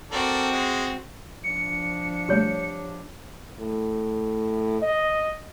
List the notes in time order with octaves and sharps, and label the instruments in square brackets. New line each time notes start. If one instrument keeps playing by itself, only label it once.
[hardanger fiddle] C4 F#4 [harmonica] A4 A#4 D5
[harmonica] G#3
[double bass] F3 D4 [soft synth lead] C#7
[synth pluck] B2 G3 A3 [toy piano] G4 C#5
[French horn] A2
D#5